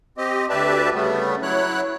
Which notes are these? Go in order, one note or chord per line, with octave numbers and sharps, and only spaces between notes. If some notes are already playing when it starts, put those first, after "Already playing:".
C4 G4 D#5
D2 G4 B4 D5 E5 A5
C#3 G3 A3 B3
F#3 E4 C#5 F#6